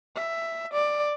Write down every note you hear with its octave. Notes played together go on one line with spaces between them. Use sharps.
E5
D5